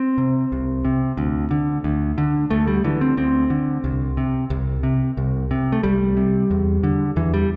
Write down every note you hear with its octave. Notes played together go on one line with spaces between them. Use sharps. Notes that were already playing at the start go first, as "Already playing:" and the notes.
Already playing: C4
C3
C2
C3
D2
D3
D2
D3
D2 A3
G3
D3 E3
C4
D2 C4
D3
C2
C3
C2
C3
C2
C3
A3
C2 G3
C3
E2
D3
E2 E3
G3